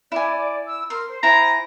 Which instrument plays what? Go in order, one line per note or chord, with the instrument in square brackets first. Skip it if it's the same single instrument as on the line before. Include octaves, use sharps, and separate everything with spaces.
[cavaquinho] E4 G#5 [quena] D5
[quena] D5
E6
[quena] A#4 [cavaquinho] C6
[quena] C5
[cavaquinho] E4 G#5 [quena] C5 [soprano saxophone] A#5